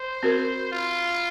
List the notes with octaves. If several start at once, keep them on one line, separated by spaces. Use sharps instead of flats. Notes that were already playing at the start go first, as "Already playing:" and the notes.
Already playing: C5
C4 F#4 A#4
F4